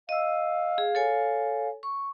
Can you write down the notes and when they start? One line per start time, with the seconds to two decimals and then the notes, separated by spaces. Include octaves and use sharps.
0.09 D#5 F5 E6
0.78 G#4
0.95 A4 C#5 G#5
1.83 C#6